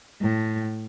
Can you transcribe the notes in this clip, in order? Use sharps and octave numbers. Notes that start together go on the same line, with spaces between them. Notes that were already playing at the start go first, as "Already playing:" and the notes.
A2